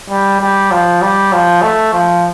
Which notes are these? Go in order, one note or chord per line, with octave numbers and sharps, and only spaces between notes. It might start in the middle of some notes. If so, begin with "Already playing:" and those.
G3
G3
F3
G3
F3
A3
F3